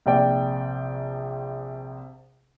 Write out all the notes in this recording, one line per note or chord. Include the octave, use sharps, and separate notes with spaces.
A#1 C3 D5 G5